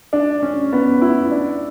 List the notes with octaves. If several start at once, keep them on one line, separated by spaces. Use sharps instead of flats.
D4
C#4
B3
E4
D4